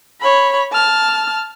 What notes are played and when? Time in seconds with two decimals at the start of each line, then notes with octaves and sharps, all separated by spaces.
0.21 C#5 B5
0.72 A5 F6